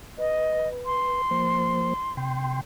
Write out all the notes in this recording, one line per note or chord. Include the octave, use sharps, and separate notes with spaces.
B4 D#5
C6
F3 A#3 C5
C3 G5 C6